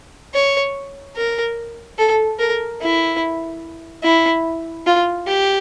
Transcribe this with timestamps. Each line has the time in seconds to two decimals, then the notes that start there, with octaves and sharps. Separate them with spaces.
0.34 C#5
1.16 A#4
1.98 A4
2.39 A#4
2.81 E4
4.03 E4
4.86 F4
5.27 G4